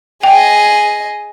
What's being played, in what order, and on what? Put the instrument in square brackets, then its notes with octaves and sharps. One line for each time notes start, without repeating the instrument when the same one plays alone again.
[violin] G#4 D#5 [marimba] G5